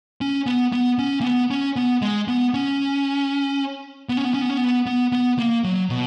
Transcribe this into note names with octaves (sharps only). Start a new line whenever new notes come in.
C#4
B3
B3
C#4
A#3
B3
C#4
B3
G#3
B3
C#4
B3
C#4
B3
C#4
B3
C#4
B3
B3
B3
A#3
F#3
B2